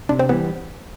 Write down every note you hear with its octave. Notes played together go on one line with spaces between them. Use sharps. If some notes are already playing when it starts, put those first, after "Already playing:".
C3 D4 D5
C4 C5
E3 G3 B3 B4